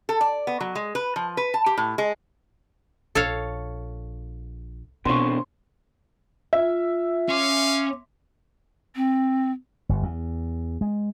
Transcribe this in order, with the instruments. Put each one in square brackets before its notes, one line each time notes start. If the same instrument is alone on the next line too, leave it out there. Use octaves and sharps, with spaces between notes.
[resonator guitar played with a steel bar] A4
D5
B3
F#3
G#3
B4
F3
B4
A5
G4
A2
G#3
[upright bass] A#1 [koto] A4 C#5 F5
[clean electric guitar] E2 D3 C4 [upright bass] B2 [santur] C6 C#6
[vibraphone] F4 [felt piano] E5
[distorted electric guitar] C#4 [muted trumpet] F5 [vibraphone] C6 D6
[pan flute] C4
[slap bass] G1
E2
G#3